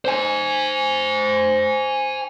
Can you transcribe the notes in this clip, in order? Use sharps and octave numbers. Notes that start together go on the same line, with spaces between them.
C5 G#5